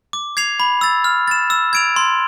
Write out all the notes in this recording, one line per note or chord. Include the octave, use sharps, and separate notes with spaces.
D6
G#6 C7 F7
B5
E6 A6
F6
A6 E7
E6
G#6 D7 F7
C6